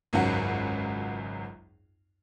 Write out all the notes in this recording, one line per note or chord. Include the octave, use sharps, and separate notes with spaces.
G#1 C#2 F#2 F#3 F#5